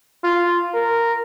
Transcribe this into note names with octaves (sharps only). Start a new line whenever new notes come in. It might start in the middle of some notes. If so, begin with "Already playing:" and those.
F4
A#4